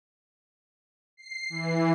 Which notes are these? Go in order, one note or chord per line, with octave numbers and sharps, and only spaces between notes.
C7
E3